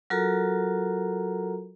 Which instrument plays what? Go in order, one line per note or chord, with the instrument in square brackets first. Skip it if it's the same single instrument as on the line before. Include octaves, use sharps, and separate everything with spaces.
[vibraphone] F#3 F4 F#4 A4 A#4 A#5